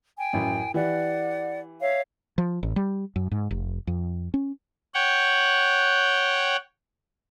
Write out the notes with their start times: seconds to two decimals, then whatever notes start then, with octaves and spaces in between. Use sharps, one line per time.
0.17 G5 G#5
0.33 A1 F#2
0.74 E3 G4 D5 F#5
1.81 C#5 E5 F5
2.38 F3
2.63 A1
2.76 G3
3.16 F#2
3.32 G#2
3.51 F1
3.87 F2
4.34 C#4
4.94 C#5 F#5 G5